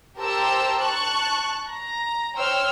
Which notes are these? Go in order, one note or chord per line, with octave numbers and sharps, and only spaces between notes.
G4 A#4 C5 A5 A#5 E6
A5 C#6 F#6
A#5
C5 C#5 G5 E6 F6